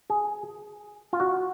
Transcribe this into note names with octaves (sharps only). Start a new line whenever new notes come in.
G#4
F4
F#4